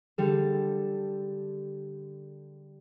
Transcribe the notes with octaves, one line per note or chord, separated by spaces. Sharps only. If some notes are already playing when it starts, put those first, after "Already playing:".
D3 G3 A4